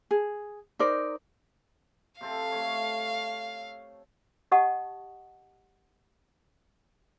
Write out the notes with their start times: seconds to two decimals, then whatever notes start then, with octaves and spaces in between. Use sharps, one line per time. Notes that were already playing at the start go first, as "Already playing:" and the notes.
0.11 G#4
0.79 D#4 A#4 C5 D5
2.21 C3 C4 A4 F5
2.52 A3 C#5
4.52 G4 D#5 F#5 A5 C#6 D#6